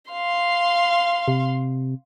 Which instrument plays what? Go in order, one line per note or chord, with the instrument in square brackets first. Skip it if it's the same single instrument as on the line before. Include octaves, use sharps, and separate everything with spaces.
[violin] F5 C6
[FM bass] C3